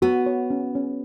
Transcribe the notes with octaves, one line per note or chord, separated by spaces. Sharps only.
B3 F#4
C#5
C#4
C#4